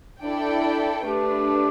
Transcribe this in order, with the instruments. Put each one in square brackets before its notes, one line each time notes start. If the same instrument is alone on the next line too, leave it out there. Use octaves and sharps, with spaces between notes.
[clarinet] D4 [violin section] E4 A4 D5 G5
[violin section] A3 D4 B4 [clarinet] G4